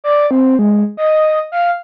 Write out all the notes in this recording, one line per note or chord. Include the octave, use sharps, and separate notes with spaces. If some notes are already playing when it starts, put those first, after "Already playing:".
D5
C4
G#3
D#5
F5